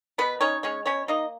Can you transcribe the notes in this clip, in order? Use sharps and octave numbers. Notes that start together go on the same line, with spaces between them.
B2 B3 B4
C#4 D#4 C#5
G#3 C#4 C#5
B2 C#4 C#5
A#3 D#4 D#5